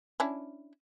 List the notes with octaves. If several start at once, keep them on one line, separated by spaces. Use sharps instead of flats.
C#4 D4 E4